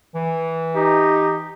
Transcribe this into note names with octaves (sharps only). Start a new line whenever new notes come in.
E3
D#4 G4